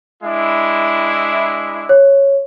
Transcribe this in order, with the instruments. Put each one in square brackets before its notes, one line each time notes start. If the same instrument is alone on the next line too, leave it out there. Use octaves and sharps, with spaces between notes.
[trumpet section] G#3 D4 E4
[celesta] C#5